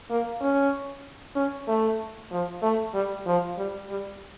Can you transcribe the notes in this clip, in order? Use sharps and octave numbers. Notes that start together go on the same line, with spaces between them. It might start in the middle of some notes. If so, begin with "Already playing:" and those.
A#3
C#4
C#4
A3
F3
A3
G3
F3
G3
G3